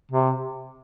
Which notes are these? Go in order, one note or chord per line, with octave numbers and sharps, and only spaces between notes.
C3